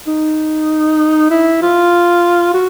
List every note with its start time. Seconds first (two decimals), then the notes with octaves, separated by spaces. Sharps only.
0.07 D#4
1.30 E4
1.62 F4
2.54 F#4